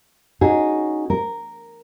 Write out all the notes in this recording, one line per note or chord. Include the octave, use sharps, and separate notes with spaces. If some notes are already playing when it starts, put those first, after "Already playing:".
C#4 D#4 F#4 G#4
A#4